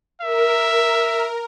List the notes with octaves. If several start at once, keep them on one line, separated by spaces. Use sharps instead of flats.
A#4 E5